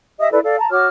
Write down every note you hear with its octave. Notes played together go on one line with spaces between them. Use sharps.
G4 D#5 E5 D#6
E4 A4 B4 D5
A4 D5 F5
A5 A#5
F#4 C#5 D6 F6